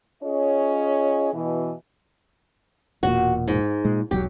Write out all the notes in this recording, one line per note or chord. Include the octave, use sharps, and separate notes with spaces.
C#4 F4 G#4 C#5 D#5
B2 E3
E1 A#2 F#4
G#2
A#2 G#3
E1 B1 F#3 G4